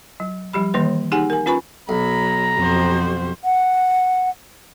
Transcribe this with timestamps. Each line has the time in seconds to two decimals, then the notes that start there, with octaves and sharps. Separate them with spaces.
0.20 F#3
0.53 F3 G3 G4 B5
0.74 D#3 E3 G3 A#3 B4
1.12 D#4 G4 G#4 F#5 G#5
1.30 A#4 G#5
1.46 C#4 F4 B4 G#5 B5 C#6
1.89 B1 F#3 A#5 B5
2.59 F2 F#4 C5
3.44 F#5